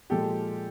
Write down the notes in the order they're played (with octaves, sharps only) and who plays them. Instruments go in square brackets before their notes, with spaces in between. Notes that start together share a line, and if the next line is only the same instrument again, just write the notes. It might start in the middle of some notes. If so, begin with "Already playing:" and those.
[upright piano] A#2 F3 G#3 G4 A4